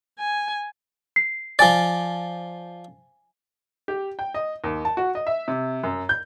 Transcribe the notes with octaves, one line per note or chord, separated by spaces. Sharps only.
G#5
C7
F3 D5 G#5 A6
G4
G5
D#5
D#2
A5
F#4
D#5
E5
C3
F#2
G6